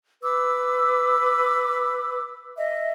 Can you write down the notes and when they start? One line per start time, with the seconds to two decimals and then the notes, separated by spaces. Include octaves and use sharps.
0.22 B4 D6 E6
2.55 D#5 E5